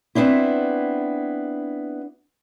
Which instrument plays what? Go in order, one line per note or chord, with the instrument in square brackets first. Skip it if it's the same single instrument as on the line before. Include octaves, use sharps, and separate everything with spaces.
[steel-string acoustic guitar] B3 C4 D4 E4